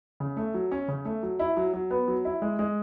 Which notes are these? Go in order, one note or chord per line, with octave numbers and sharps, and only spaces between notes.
C#3
A3
F#3
C#4
C#3
A3
F#3
E4
F#3
F#3
B3
F#3
E4
G#3
G#3